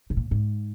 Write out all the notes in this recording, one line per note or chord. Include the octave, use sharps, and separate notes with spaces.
B2
A#2
G#2